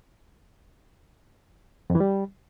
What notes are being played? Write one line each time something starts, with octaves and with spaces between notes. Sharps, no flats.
F2
E3
G3